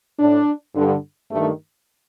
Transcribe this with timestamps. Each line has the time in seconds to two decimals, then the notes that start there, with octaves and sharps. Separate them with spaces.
0.20 A2 D4
0.75 G2 D3
1.31 G2 D#3 A3